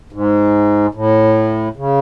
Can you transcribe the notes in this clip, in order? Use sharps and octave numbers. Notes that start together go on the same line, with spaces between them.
G#2
A2
C#3